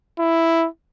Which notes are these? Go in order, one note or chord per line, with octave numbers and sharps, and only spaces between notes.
E4